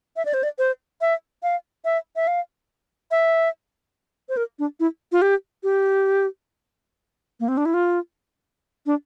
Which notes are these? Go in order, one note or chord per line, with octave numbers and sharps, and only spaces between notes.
E5
D5
C5
D5
C5
E5
F5
E5
E5
F5
E5
C5
A#4
D4
E4
F4
G4
G4
A#3
C4
D4
E4
F4
D4